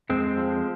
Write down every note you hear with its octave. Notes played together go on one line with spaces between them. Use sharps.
F2 G#3 C4
F3